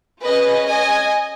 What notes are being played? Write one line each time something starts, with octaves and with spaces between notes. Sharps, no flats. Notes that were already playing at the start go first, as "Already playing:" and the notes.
C#4 G#4 B4 D#5
D#5 G#5